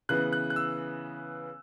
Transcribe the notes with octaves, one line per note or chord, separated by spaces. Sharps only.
C#3 E3 B3 F#6
F#6
F#6
E6